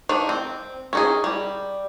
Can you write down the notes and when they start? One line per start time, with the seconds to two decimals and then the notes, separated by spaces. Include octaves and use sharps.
0.09 D#3 D4 F5
0.29 C4
0.93 C#4 D#4 G#4
1.24 G3